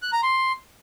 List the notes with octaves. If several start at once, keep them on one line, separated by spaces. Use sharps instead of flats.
F#6
A#5
C6